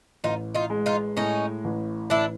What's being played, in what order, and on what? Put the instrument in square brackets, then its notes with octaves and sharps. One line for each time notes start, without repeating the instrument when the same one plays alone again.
[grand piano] A1 [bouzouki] D#4 F4
[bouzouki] D#4 F4
[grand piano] G#3
[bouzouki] D#4 F4
[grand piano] A2 [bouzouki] C#4 D#4
[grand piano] A1
[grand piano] A1 [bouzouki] D4 E4